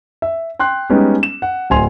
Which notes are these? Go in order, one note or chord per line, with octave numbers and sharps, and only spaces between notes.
E5
G5 C6 F#6
G3 G#3 B3 C#4 D#4 G4
E7
F#5
D1 C5 G#5 C6 F7